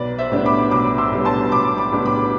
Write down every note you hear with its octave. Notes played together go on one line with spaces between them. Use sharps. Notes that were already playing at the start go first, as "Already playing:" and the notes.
Already playing: B1 B4 D5
C5 E5
A2 G3 B3 D4
B5 D6
B1 B5 D6
C6 E6
A2 G3 B3 D4
A5 C6
B1 B5 D6
B5 D6
A2 G3 B3 D4
B5 D6